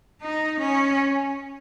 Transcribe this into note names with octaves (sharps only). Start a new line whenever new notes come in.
D#4
C#4